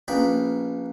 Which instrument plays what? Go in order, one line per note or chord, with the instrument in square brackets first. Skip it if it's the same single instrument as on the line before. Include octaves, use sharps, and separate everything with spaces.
[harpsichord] A#1 A#3 B3 C#4 G5 B5